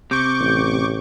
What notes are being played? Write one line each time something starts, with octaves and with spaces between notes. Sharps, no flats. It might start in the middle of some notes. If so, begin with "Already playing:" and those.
C3 C#6 D6 G6
A1